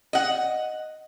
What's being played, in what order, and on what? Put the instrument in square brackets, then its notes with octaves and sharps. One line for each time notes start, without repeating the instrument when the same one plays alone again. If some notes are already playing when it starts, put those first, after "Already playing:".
[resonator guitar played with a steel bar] D#5 F#5